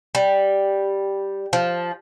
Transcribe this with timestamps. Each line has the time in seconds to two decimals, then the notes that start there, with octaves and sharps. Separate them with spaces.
0.15 G3
1.53 F3